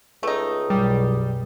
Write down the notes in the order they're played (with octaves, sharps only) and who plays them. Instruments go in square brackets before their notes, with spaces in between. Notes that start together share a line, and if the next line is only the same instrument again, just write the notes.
[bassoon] C#2 [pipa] A3 D#4
[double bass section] B1 F#2 [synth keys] G3